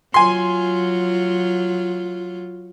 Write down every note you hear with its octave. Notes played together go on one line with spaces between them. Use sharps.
F#3 F4 G#5 C6